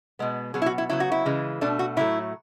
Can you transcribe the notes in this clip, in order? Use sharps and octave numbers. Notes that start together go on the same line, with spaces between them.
B2 G#3 B3
B2 F#3 B3 G#4
E4
F#4
E4
C#3 F#3 B3 E4
F#4
E4
C#3 E3 G#3
B2 A3 D4
F#4
A2 F#3 A3 E4